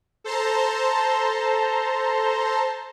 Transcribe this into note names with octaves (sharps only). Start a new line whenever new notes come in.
A4 C5 A5 A#5 C6